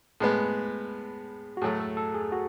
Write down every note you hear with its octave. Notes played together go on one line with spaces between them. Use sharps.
A2 G#3 B3 G#4
F#4
A2 F#3 A3 G#4
A4
A4
G#4
F#4